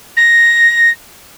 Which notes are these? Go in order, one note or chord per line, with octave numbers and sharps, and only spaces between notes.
A#6